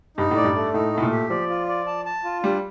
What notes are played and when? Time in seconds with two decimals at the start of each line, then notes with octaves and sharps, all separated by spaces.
0.17 G2 D#4
0.31 A2
0.36 D5
0.44 G2
0.55 A3
0.74 A2 D#4
0.93 A2 A3
1.02 A#2
1.11 G4
1.30 F3 D5
1.49 F4
1.68 D5
1.86 A5
2.06 A5
2.24 F4
2.43 G3 D4